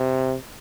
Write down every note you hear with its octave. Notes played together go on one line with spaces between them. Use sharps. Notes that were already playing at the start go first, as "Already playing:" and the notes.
Already playing: C3